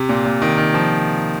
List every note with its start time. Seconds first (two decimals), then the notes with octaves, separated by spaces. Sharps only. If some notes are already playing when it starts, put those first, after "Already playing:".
Already playing: C3
0.09 A#2
0.25 A#2
0.42 D#3
0.58 D#3
0.74 F3